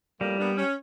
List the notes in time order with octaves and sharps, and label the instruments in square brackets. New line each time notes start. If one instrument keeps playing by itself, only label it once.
[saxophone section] F2 A2 A#3 [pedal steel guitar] G3
[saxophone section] A#3 B3 D4
C#4